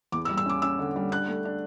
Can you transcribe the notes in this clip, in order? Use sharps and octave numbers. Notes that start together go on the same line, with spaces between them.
E2 D6
E6
G3
E6
C#4 D6
C#4 E6
D3
G3
D4 F#6
A3
D4